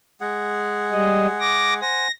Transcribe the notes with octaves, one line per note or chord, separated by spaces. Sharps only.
G#3 G#4 F#5
G3 D#5
D6 A#6
C5 F#5 G#5 A#6